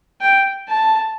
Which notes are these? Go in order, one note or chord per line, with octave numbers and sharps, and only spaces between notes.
G5
A5